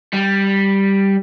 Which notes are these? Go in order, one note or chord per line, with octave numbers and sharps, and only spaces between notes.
G3